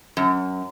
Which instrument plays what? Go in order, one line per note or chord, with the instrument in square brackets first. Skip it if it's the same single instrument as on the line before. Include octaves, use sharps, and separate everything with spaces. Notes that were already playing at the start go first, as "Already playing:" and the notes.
[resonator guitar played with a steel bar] F#2